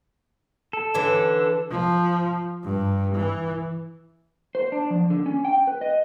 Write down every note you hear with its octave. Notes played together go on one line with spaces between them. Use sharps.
A4
D3 E3 C#4
F3
G2
E3
C5
D4
F3
D3
C#4
G5
B4
D#5